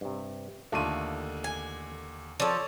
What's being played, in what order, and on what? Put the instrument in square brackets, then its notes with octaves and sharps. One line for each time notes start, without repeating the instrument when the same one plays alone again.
[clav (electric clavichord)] G2 C3
[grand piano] D#2 D3 D#7 [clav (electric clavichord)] A3 F4
[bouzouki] G#5
[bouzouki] F3 A4 [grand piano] C#5 D5